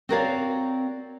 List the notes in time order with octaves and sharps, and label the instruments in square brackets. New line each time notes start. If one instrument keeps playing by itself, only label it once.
[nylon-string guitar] C4 F#4 A#4 C#5 D5 F5